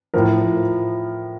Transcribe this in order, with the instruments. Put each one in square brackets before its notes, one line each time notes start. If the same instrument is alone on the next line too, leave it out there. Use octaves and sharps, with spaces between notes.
[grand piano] A2 F3 A#4